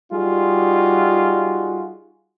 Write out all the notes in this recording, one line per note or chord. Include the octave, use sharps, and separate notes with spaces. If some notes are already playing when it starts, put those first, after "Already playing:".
G3 D#4 F4 F#4 G#4